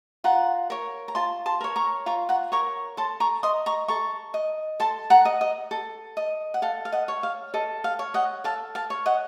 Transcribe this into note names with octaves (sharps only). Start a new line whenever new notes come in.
F4 F#5 A#5
A#4 C#5
A#5
F4 A5 C6
A5 C6
A#4 C#5
A#5 C#6
F4 A#5 C#6
F#5 A#5
A#4 C#5 A#5 C#6
A4 A5 C6
A#5 C#6
D#5 C6 D#6
A#5 C#6
A4 A#5 C#6
D#5
A4 A5 C6
F#5 A#5
D#5
D#5
A4
D#5
F#5
A4 F5
F5
D#5 F#5
C#5
F5
A4 D#5
F5
C#5
D#5 F#5
A4 F5 A5
F5 A5
C#5
D#5 F#5